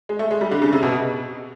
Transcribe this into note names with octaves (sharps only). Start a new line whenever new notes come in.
G#3
A3
G#3
G3
D3
C#3
C3
B2